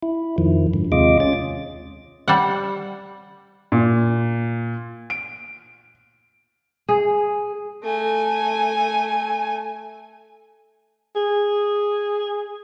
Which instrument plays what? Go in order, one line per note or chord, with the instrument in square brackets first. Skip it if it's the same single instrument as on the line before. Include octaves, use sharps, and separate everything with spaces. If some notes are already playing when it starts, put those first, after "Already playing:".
[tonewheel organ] E4
F2 D#3 F3
G#2 D3
D#2 C3 G#3 F4 D#5 D6
C#4 A6
[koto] G3 F#5
[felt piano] A#2
D7
[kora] G#4
[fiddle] A3 G#5
[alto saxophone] G#4